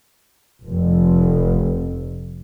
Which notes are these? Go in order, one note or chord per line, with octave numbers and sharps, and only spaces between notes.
F1 F2